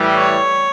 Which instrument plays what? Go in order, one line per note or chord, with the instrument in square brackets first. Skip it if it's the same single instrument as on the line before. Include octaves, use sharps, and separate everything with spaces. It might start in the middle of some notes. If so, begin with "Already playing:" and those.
Already playing: [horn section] A2 E3 G3
[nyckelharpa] C#5